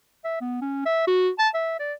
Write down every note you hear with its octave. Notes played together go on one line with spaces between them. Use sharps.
E5
B3
C#4
E5
F#4
A5
E5
D5